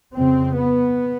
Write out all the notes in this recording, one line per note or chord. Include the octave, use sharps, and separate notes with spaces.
F2 C#3 C4
B3